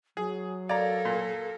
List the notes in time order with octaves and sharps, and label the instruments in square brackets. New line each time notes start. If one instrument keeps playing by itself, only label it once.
[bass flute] F#3 [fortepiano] G#4
[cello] A4 A#4 [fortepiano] D5 A#5 [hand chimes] F5 G#6
[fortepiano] A#2